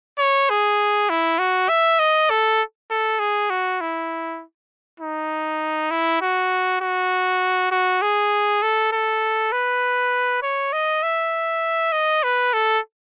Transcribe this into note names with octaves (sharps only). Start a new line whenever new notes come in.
C#5
G#4
E4
F#4
E5
D#5
A4
A4
G#4
F#4
E4
D#4
E4
F#4
F#4
F#4
G#4
A4
A4
B4
C#5
D#5
E5
D#5
B4
A4